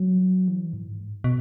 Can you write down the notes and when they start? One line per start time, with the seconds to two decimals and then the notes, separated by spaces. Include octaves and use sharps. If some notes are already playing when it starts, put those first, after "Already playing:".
Already playing: F#3
0.48 E3
0.73 G#2
1.24 B2